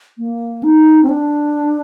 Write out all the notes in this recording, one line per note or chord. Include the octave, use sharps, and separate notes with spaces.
A#3
D#4
C4
D4